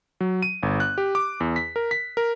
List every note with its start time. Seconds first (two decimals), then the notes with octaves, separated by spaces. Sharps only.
0.21 F#3
0.42 D#7
0.63 G1
0.80 F#6
0.98 G4
1.15 D6
1.40 E2
1.56 B6
1.76 A#4
1.91 B6
2.17 A#4